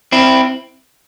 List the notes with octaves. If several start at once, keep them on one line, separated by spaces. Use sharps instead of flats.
C4 E4